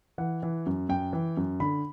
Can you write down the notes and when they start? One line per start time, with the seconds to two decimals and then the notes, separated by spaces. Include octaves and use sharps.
0.18 E3 F#5
0.43 E3
0.66 F#2
0.89 F#2 G5
1.13 E3
1.37 F#2
1.60 D3 B5